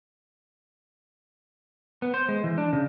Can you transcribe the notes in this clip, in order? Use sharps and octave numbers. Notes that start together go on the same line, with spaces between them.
B3
C5
G#3
E3
D4
C#3